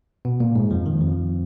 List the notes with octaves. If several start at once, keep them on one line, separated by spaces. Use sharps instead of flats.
B2 B3
A#2 A#3
G#2 G#3
F2 F3
D#3
F2 F3